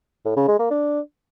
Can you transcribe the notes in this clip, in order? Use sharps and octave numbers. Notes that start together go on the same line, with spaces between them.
A2
C#3
G#3
A#3
D4